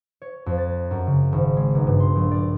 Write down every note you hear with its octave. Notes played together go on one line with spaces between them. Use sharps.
C#5
F2
A6
F#2
C#3
G#1
G#3
B1
G2
C6
A#1
D5